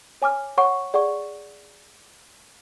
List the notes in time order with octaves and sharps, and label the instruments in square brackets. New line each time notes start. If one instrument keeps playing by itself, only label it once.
[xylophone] C#5 G#5 D6 F6
C#5 F#5 C#6
G#4 D5 F#5 C#6